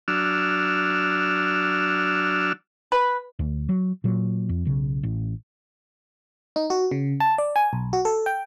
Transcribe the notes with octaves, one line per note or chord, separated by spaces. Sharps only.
F#3 D4 E6 F6
B4
D2
F#3
A#2 F#3
F2
B1 C#3
A1
D#4
F#4
C#3
A5
D5
G#5
B1
F#4
A4
G5